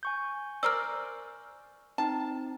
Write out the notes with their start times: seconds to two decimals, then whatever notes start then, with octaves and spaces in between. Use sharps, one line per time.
0.03 G#5 C#6 G6
0.63 A#4 C5 D5 E6 F6
1.98 C4 D#4 A5